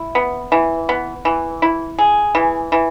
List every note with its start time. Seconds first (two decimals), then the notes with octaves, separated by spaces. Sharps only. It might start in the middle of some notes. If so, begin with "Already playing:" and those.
Already playing: E4
0.15 B3
0.52 E3
0.89 B3
1.25 E3
1.62 E4
1.99 G#4
2.35 E3
2.72 E3